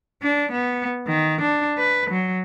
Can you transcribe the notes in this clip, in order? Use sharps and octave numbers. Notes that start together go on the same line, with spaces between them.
D4
B3
D#3
D4
B4
F#3